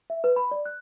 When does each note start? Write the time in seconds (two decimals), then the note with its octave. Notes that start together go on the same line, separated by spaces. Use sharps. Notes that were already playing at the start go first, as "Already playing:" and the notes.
0.10 E5
0.24 B4
0.36 B5
0.51 D5
0.66 F#6